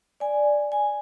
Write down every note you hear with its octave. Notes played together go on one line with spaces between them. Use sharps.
D5 G#5
G#5